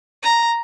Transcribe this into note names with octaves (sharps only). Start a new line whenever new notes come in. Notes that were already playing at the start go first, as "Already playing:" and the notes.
A#5